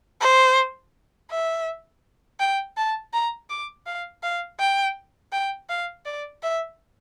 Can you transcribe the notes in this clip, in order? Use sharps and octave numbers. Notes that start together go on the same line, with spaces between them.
C5
E5
G5
A5
A#5
D6
F5
F5
G5
G5
F5
D5
E5